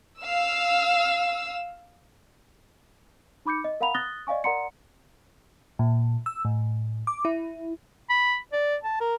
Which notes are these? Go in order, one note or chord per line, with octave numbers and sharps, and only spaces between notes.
F5 E6
D#4 B5 D6 G6 C#7
D#5
A#4 F5 F#5 A#5 B5 F7
D#6 F#6 A6 A#6 G7
D5 D#5 F5 G#5 C#6
A#4 D5 F#5 A#5 C6 C#7
A#2
E6
A2
D6
E4
B5
D5
A5
A#4